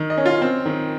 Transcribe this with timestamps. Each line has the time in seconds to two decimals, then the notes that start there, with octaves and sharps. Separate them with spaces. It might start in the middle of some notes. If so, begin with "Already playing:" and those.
Already playing: D#3
0.10 D#5
0.17 C#4
0.26 F4
0.42 C4
0.66 D#3